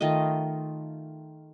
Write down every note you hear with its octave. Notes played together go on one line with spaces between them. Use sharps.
D#3 A3 F4 D#5